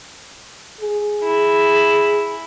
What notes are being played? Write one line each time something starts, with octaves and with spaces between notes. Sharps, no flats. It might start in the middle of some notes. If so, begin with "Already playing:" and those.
G#4
E4